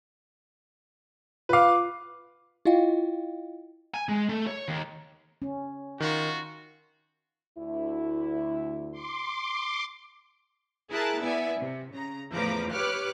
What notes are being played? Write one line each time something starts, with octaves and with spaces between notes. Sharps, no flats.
F4 B4 F5 D6
E4 F4 D#5 F5 G5
G#5
G#3
A3
C#5
D#2
C#4
D#3 F4 F#4
D2 E4
C6 D6
E4 G#4 A#4 A5 F#6 A6
B3 E4 D5 E5 G#5
C3
C#3 A#5
E2 A2 F3 B4 A#5 D6
G4 B4 C#5 D6 F6 F#6